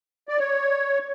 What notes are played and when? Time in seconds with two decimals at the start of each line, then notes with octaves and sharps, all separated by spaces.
0.28 D5
0.38 C#5